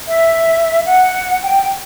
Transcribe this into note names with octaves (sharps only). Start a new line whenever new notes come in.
E5
F#5
G5